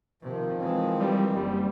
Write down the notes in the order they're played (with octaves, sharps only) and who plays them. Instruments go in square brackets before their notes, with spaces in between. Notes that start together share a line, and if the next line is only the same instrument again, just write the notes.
[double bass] C3 [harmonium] D#3 F3
[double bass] E3 G#3 [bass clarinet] C4
[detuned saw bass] G3
[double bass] F#1 [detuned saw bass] G3